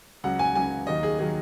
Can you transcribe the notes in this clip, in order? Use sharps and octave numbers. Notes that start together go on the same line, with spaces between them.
C#2 C#3 F#3 F#5
G#5
C#2 C#3 F#3 G#5
D#2 D#3 F#3 D#5
G#4
D#3 F#3 G#4